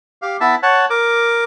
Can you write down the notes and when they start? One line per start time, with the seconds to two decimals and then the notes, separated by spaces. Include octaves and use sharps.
0.22 G4 F5
0.41 B3 E4 E5 A5
0.63 C#5 F#5 A5
0.90 A#4 D6